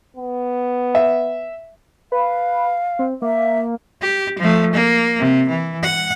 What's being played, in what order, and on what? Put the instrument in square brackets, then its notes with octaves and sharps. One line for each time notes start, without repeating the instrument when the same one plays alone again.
[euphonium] B3
[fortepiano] E5
[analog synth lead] B4 [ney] F5
[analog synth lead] C4
[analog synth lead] A#3 [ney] E5
[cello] G4
F3 A3
A#3
C3
E3
F#5